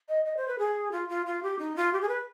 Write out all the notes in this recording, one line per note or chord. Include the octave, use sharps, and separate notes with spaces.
D#5
D#5
C5
B4
G#4
F4
F4
F4
G4
D#4
F4
G4
G#4
B4